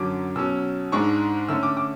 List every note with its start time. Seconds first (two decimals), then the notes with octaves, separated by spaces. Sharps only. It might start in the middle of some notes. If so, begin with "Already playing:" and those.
Already playing: F#2 D3 F#3 C#4 D6
0.36 B2 F#3 C#4 E6
0.92 G#2 G#3 D4 C#6
1.49 D3 A3 C#4 E6
1.63 D6
1.77 D6